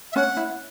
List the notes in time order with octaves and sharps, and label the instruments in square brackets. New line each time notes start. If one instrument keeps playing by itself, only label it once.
[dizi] E5
[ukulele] C#4 [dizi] F#5
[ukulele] E4